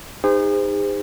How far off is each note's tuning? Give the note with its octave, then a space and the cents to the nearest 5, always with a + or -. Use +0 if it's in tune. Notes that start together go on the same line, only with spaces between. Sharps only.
D#4 +0 G#4 -45 C5 -30